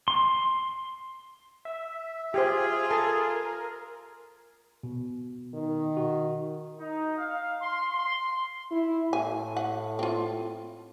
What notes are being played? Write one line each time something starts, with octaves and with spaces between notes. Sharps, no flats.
C6
E5
F4 G4 G#4 C5
A4 A#4 G#5 A5
B2
D#3
F#4
D#4
F5
C6
C6
E4
A2 G#5
F#5
C4 F4